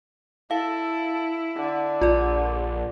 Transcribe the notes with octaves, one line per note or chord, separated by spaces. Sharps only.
E4 A4 F5
D3
A#1 F4 D5